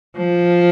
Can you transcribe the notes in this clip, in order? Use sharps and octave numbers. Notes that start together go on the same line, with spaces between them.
F3